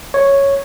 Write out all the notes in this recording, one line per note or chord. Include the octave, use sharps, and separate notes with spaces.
C#5